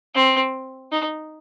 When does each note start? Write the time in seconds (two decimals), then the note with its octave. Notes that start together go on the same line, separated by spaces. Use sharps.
0.15 C4
0.92 D#4